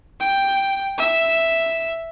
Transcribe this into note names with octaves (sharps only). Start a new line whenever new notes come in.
G5
E5